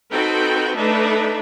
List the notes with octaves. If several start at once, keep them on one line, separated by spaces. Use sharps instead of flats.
C4 D#4 F#4 A4 B4 G5
A3 D4 D#4 B4 E5